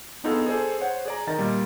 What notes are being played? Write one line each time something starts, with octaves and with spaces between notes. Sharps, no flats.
B3 D4 D#4 F4 G#4 A4
G#4 A4 C5 D5
C5 C#5 F#5
G#4 D5 A#5
D#3 D#5 A#5 A6
A#2 G3